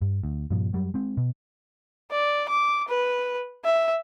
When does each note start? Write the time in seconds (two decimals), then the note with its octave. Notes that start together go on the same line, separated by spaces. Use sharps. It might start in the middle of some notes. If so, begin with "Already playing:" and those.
0.01 G2
0.23 D2
0.50 G2 A#2 F3
0.73 F#2 F#3 G3
0.94 G#3 C4
1.17 B2
2.11 D5
2.49 D6
2.89 B4
3.65 E5